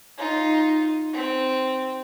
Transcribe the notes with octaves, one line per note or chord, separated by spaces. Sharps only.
D#4 F4
C4